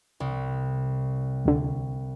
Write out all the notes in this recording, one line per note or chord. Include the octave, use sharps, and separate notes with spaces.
C2
D2 D3